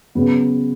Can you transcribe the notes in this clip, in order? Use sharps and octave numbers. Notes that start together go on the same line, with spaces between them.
C#3 F#3 B3